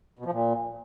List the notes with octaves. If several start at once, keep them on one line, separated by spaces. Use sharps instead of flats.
B2
F3
A#2